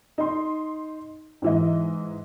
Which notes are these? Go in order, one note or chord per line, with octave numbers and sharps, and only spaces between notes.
D#4 C6
G#2 E3 D#5